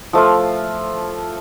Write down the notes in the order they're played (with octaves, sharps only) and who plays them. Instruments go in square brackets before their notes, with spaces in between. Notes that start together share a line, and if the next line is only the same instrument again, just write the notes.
[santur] F3 A3 F4